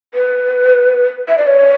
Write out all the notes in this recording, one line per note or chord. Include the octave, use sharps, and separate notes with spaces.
B4
E5
D5
C#5